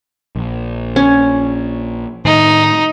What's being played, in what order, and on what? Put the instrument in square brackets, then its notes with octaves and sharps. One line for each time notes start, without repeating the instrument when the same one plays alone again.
[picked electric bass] A#1
[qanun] C#4
[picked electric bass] A2 D#3 A3 [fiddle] D#4